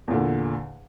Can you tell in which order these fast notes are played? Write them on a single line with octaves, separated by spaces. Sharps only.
E2 A#2 D3